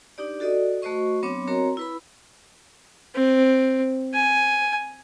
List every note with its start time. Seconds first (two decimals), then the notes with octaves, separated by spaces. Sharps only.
0.18 D4 D#4 G4 D5
0.40 F#4 A4 D5 D#5 D#6
0.82 A3 F#4 C5 D#5 C#6
1.23 F#3 B3 C4 D4 C#5 D6
1.47 C4 F#4 A#4 C#5 D#5 A#5
1.77 E4 B4 B5
3.15 C4
4.14 G#5